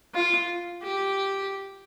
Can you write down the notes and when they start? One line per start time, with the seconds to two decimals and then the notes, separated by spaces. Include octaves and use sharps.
0.15 F4
0.83 G4